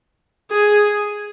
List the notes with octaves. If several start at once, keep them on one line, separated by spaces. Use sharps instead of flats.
G#4